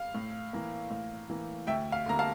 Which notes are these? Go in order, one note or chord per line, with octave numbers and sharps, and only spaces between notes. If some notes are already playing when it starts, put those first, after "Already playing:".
Already playing: F5
A2
E3 A#3
A2
E3 A#3
D2 E5 G5
F5
D3 G3 A#3 A#5
F5 A5